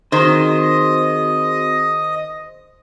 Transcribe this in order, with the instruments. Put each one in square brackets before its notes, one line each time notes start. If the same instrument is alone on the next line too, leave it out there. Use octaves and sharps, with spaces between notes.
[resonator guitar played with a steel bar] D#3 [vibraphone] C4 F#4 G#4 [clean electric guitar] C5 [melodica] D#5